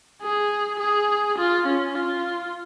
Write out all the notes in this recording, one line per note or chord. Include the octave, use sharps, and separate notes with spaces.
G#4
G#4
F4
C#4
F4